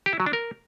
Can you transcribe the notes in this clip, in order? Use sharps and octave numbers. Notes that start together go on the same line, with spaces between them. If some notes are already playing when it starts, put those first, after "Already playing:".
G4
E4
F#3
D4
A#4